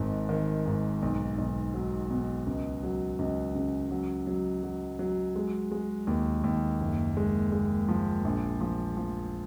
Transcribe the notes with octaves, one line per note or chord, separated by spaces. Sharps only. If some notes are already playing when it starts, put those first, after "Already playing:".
Already playing: G#1 G#2
D#3
G#2
B1
B1
F#3
B2
C#2
F#3
C#2
C#3
F#3
F#3
F#3
F#3
G#3
G#3
D#2
D#2
F#1
G#3
G#3
F3
A#1
F3
F3